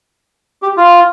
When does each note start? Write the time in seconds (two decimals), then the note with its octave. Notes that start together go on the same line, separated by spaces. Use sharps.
0.62 G4
0.77 F4